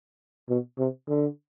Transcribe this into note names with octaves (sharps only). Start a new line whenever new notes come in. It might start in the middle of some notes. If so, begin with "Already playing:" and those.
B2
C3
D3